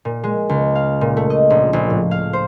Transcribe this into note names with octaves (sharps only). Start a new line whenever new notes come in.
A#2
G#3
C#2
F5
A#2
A3
D#5
A#1
A#1
A2
F5
C5